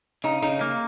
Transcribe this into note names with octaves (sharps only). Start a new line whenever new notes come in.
C#3 D#4
C#3 D#4
A#3